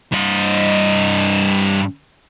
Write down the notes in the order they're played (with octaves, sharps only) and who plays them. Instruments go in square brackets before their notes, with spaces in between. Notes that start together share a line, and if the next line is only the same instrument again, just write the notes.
[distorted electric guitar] G2 D#5